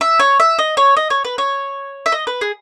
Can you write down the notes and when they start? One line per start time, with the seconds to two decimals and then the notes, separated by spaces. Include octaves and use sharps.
0.01 E5
0.19 C#5
0.40 E5
0.59 D#5
0.77 C#5
0.97 D#5
1.10 C#5
1.24 B4
1.38 C#5
2.06 E5
2.12 D#5
2.27 B4
2.41 G#4